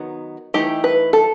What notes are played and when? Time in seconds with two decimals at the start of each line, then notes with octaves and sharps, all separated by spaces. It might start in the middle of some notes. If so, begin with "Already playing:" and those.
Already playing: D#3 F#3 B3 D#4
0.54 E3 A3 D#4 G4
0.84 B4
1.13 A4